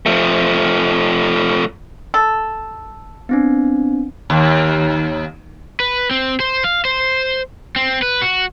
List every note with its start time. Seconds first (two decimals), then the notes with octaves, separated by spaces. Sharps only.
0.06 F3 A3
2.14 A4
3.29 B3 C4 D4
4.30 D#2
5.80 B4
6.11 C4
6.40 C5
6.64 F5
6.85 C5
7.76 C4
8.02 B4
8.22 F#4